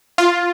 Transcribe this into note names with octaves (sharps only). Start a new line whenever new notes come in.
F4